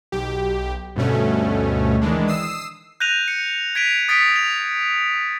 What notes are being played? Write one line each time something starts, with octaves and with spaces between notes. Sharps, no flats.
B1 G4
D2 G2 B2 A3 C#4
D#3 E3 G#3 D4
D#6 E6 C7 E7
F#6 G6 A#6 D#7 F7
C#7
G#6 B6 D7 D#7 F7
D#6 A6 B6 C#7 D7
F7